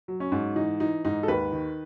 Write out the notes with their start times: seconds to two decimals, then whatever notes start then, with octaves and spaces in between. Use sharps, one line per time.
0.08 F#3
0.20 C#4
0.32 G#2
0.56 E3 D#4
0.80 E3 D#4
1.05 G#2 D#4
1.23 A4
1.28 D#2 B4
1.52 D#3